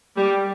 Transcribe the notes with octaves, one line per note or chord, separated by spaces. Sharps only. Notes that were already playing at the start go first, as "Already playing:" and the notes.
G3